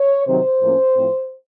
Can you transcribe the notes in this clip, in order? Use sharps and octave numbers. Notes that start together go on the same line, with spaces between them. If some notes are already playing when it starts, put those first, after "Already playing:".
Already playing: C#5
C3 D#3 F#3 C4 C5
A2 F3 A#3 C#4
A2 F3 C4